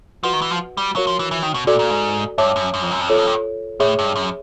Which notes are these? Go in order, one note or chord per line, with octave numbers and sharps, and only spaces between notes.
F3 F#4 B4 D#5 F#5
D#3
E3
F3
G3
F#3 F#4 A#4 C#5 F5
F3
E3
E3
D#3
B2
A#2 F#4 A4 D5
A#2
G#2
G2 C#5 E5 A5 D6
F#2
F#2
F2
F#2
F2
E2 F4 A4 C#5
F2
G2
A2 G#4 C#5 E5
G2
F#2